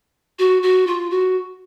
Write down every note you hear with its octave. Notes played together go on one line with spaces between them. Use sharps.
F#4
F#4
F4
F#4